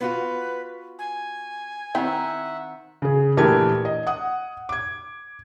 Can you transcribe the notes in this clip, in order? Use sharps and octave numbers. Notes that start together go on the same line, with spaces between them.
B3 F4 F#4 B4
G#5
D#3 C4 E4 E5 F#5 G5 A#5
C#3 G#4
A#1 E3 A3 G4 A#4 G#6
D#5
F#5 D#6
D6 G#6